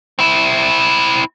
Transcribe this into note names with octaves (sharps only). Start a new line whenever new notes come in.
C4 E4